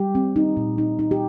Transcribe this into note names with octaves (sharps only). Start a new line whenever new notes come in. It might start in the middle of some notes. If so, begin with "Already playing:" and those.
Already playing: G3 G4
C4
D#4
A#2
D#4
D#4
G4